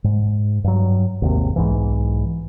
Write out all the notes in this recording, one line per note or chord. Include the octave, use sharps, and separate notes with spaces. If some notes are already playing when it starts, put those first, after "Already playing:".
G#2
G2 F#3
G#1 D#2 C3
B1 G#2 E3